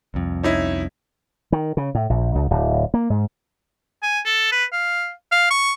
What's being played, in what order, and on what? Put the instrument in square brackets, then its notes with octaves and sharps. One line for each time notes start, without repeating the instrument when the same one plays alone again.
[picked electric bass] C2 F2
[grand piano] C#4 D#4 E4
[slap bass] D#3
C#3
A2
A#1
C#2
D1
A#3
G#2
[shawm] G#5
A4
B4
F5
F5
C#6